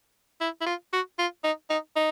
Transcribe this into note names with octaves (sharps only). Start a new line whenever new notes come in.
E4
E4
F4
F#4
F4
D#4
D#4
D#4